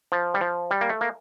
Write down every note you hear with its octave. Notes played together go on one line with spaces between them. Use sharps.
F3
G3
F3
G3
A#3
A3
A#3